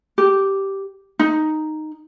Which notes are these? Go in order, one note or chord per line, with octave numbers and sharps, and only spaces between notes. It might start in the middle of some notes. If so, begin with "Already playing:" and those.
G4
D#4